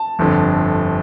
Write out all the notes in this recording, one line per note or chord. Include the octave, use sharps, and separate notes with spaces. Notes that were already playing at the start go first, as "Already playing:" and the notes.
Already playing: A5
G1 F2 D3